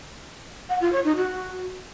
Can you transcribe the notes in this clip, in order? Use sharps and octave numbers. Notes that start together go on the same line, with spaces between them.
F#5
F4
C#5
D#4
F#4